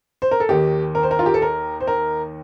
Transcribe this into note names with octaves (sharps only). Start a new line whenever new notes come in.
C5
A#4
A4
D#2 D#3 G4
A#4
C5
A#4
F4
G4
A4
A#4
C5
A#4